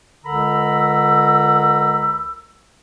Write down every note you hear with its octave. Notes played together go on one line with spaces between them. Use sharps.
C#2 D3 A#4 A#5 B5 E6